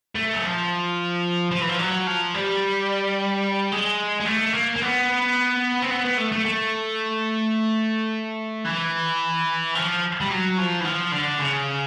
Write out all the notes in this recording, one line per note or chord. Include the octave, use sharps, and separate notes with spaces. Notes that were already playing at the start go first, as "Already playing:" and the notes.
A3
F#3
F3
F3
E3
F3
F#3
F3
G3
G#3
G#3
A3
A#3
A#3
B3
C4
B3
B3
A3
A3
A3
E3
F3
G3
F#3
F3
E3
F3
D3
C#3